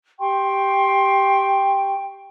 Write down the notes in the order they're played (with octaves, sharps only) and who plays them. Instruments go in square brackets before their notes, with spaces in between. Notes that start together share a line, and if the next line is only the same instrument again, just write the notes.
[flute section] G4 G5 C6 C#6